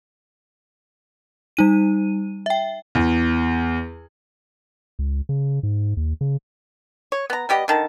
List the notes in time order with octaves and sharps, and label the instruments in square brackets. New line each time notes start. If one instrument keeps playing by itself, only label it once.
[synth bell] G3 D#4 D#7
E5 G5
[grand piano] E2
[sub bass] C#2
C#3
G#2
D#2
C#3
[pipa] C#5
B3 A#5
G3 B3 G4 D#5
D3 D#3 A5